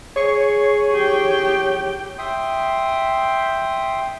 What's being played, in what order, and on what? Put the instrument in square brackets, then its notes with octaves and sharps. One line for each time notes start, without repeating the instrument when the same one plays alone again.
[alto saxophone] G#4 [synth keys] C#5 C#6
[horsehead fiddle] G4 G5
[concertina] E5 G5 C6 D#6